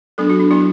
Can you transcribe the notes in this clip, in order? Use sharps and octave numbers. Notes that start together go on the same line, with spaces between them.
F#3 B3 D4 A4
F#4
D4
F#3 B3 D4 E4